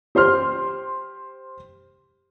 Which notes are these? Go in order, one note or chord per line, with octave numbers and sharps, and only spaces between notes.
G4 C5 C6 F6